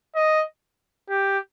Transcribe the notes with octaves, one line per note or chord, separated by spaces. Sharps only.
D#5
G4